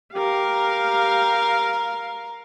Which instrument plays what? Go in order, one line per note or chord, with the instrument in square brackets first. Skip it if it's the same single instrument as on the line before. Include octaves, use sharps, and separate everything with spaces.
[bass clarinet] G4 [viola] A#4 F5